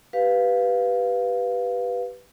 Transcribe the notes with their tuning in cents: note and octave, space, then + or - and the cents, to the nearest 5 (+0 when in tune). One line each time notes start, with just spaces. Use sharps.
G4 -10 B4 +0 F5 +0